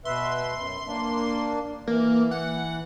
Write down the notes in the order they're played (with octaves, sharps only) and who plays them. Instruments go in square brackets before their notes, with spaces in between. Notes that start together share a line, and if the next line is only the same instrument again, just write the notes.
[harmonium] B2 B4 E5 [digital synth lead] C6
[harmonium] F#2
A#3 D4
[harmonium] E3 [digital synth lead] A#3
[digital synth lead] F#5